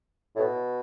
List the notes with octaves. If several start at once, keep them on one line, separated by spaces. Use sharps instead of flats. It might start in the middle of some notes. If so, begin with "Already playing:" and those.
A2
B2